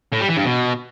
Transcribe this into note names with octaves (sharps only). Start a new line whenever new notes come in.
A2
G3
E3
G2
B2